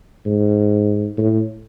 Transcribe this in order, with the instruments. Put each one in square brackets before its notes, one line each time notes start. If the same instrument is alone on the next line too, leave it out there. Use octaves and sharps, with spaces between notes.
[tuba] G#2
A2